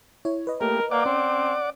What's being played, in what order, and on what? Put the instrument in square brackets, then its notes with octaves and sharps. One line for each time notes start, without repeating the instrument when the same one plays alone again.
[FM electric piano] E4 C#5
B4 D#5
[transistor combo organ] A3 A#3 G4 [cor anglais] A#4
[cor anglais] A#3 [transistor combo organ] D5 F#5 D6
[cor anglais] C4 [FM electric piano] C#4